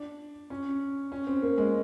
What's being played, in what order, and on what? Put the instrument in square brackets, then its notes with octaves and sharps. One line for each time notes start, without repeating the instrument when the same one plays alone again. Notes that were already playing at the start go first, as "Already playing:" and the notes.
Already playing: [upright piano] D4
C#4
C#4
C4
A#3
G#3